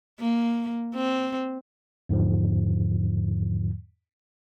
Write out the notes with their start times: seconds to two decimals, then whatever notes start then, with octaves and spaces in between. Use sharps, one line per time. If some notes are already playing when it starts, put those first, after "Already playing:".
0.19 A#3
0.95 C4
2.09 E2 G#2 D3 F3